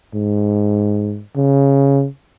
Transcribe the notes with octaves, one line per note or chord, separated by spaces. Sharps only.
G#2
C#3